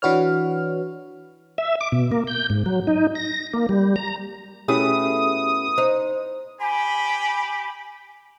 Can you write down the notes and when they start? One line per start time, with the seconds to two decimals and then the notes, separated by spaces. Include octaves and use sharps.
0.02 E3 D4 F#4 B4 C#5 F6
1.58 E5
1.81 D6
1.92 B2
2.12 A#3
2.27 G6
2.50 G#2
2.66 F#3
2.87 D#4
3.15 A#6
3.54 A#3
3.69 G3
3.96 A#5
4.68 B2 A3 C#4 E4 G4 G#4 D#6
5.78 D#4 C5
6.60 G4 G#5 B5